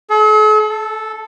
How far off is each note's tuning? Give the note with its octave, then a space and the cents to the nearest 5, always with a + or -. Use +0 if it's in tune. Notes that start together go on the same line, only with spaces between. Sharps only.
A4 -45
A4 -5